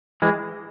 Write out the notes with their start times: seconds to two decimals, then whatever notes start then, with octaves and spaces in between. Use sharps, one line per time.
0.22 E3 G#3